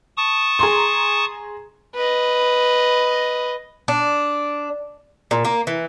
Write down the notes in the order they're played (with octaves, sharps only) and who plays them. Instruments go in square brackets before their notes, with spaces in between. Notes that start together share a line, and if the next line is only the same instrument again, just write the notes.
[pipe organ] A5 C#6 D#6
[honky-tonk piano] G#4 A#5 C6
[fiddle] B4 D#5
[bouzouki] D4
A#2
A#3
E3